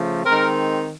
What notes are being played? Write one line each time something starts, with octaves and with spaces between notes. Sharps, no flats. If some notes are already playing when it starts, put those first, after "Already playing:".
Already playing: C#3 F3 A3
D#3 G#3 C4 A#4